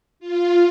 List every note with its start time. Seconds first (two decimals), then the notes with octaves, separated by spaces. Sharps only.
0.20 F4